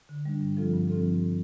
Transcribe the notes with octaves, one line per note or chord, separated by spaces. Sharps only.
D3
G3 D4
G2
F3 C4 F4 A4
G2
F3 C4 F4 A4